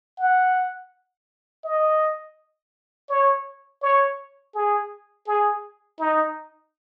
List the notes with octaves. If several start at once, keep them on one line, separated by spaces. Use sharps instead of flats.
F#5
D#5
C#5
C#5
G#4
G#4
D#4